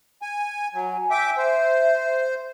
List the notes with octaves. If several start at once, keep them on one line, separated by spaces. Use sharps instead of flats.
G#5
F#3 G#5
E5 G5 D6
C5 E5